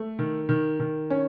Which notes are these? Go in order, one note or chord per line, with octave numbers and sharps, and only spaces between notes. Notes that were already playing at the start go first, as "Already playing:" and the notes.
Already playing: A3
D#3
D#3
D#3
C#4